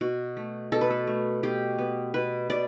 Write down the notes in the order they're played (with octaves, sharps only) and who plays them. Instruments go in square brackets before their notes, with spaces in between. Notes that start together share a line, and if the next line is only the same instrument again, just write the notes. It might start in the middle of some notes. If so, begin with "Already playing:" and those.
[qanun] B2 F#4
A3
B2 A4
B4
A4
A3
B2 G4
B3
B2 B4
B2 D5